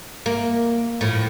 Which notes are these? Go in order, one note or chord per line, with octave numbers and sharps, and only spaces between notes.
A#3
A2 F3